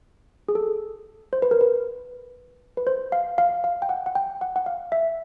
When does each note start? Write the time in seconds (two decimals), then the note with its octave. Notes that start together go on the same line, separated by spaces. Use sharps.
0.49 G#4
0.55 A4
1.33 C5
1.42 B4
1.51 A#4
1.61 B4
2.77 B4
2.87 C5
3.12 F5
3.38 F5
3.64 F5
3.82 G5
3.89 F#5
4.06 F#5
4.15 G5
4.41 F#5
4.56 F#5
4.66 F5
4.92 E5